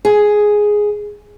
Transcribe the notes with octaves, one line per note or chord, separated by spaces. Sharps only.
G#4